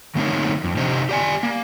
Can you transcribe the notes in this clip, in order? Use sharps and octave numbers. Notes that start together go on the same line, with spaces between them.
D3 A3 A#3 C4 D#4 C#5
F2
C3 D4 D#4 G4 C5
G4 D5 G#5
A#3